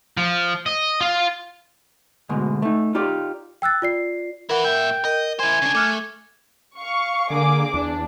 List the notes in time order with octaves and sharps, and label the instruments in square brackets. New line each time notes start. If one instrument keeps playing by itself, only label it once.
[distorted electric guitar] F3
D#5
F4
[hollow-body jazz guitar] D2 G#2 B2 G#3
A3 D#4
D#4 F4 G4 D5
[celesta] G5 E6 F#6 A6
F4 D5 C7
[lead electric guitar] E4 B4 [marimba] A#4 F#5
[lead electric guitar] A#2 E5 [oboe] G5
[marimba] A#4 [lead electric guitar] D#5
[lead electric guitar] E4 C5 [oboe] G#5
[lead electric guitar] C#3 D4
[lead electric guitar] A3 [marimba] D6 F6 F#6
[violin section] F5 C#6
[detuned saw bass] D3 [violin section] A#3 G#4 D6
[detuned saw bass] E2 [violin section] D4